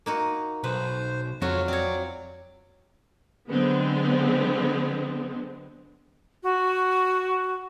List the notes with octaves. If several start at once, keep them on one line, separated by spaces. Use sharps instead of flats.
A#3 D#4 F#4
B1 B4 C5
F2 F#3 G#3 F4 F#4 C#5
C4 C#5 D5
D3 F#3 G#3 B3 C4
F#4